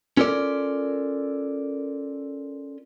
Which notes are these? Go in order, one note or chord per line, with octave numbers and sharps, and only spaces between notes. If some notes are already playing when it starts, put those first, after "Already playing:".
C#4 F4 A4 A#4 D5